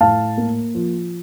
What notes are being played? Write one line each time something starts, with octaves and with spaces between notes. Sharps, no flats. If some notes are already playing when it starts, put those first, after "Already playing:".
A2 F5 A5
A#3
F3